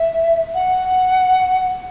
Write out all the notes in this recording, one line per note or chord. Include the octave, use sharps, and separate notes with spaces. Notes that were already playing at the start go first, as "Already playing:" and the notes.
Already playing: E5
F#5